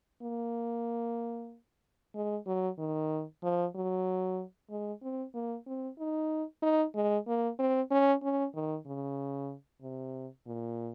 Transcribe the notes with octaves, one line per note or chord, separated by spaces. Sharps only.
A#3
G#3
F#3
D#3
F3
F#3
G#3
C4
A#3
C4
D#4
D#4
G#3
A#3
C4
C#4
C#4
D#3
C#3
C3
A#2